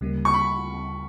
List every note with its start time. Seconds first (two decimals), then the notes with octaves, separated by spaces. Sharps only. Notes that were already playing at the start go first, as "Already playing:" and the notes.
0.01 D2 C#3 G3 A#3
0.25 C#6
0.34 B5